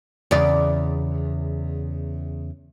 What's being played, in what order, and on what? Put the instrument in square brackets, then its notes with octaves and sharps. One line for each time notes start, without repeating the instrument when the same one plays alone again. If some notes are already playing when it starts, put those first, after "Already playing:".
[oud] E2 C#3 D5